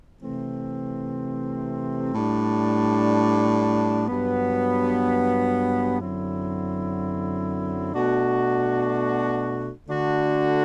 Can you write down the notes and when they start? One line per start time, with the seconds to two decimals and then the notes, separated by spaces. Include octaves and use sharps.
0.21 C3 E3 A3 C4
2.14 A2 G3 D4
4.08 G2 F#3 B3
6.01 F#2 D3 F#3 C4 E4
7.94 B2 A3 D4 F#4
9.88 D3 A3 D4 F#4